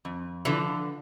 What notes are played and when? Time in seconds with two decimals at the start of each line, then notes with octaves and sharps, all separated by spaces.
0.05 F2
0.45 D3 E3 F3